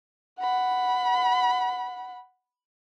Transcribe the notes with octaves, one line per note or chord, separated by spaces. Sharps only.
F#5 B5